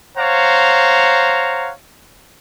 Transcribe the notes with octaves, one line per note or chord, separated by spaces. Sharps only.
C5 C#5 F5 F#5 A#5